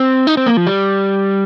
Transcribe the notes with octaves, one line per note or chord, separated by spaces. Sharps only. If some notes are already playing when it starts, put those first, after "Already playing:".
Already playing: C4
D#4
C4
A#3
F3
G3